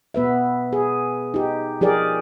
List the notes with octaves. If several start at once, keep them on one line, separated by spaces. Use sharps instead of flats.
B2 B3 B4 E5
G#4
D#4 G4
F3 D#4 G4 G#4 A#4 D5